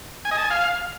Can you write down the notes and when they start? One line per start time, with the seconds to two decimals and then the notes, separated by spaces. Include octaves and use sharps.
0.25 G#5
0.31 D#5
0.38 A5
0.44 G#5
0.50 F5